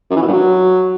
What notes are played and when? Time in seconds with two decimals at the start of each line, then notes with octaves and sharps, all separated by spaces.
0.10 F#2
0.16 E3
0.22 B2
0.27 G2
0.33 F#3